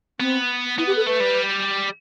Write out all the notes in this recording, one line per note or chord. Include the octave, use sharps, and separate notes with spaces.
B3 C4
B3 E4
G4
A4
A3 B4
G3